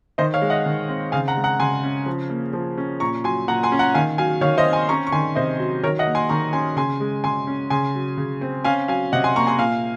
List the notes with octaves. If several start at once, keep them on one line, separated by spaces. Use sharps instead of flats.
D#3 C5 D#5
C#5 F5
G#3
D#5 F#5
D#3
C4
C#3 F5 G#5
F#5 A#5
G#3
F#5 A#5
C#3 G#5 C6
C#4
F3
A#3
F3
C#4
A#2 A#5 C#6
F#3 G#5 C6
A#2 F#5 A#5
G#5 C6
C#4
F#5 A#5
D#3 F5 G#5
F#3 F5 G#5
D#3 C#5 F5
C5 D#5
C4
G#5 C6
C#4 A#5 C#6
C#6
D#3 G#5 C6
C3 C5 D#5
F#3
D#3 A#4 C#5
D#5 F#5
A#3
G#5 C6
D#3 A#5 C#6
C#4 G#5 C6
C#3 G#5 C6
G#3
C#3 G#5 C6
C#4
C#3 G#5 C6
F#3
C#3
C4
C#4 F5 G#5
F#3 F5 G#5
C3 D#5 F#5
G#5 C6
A#3 A#5 C#6
G#5 C6
A#2 F5 G#5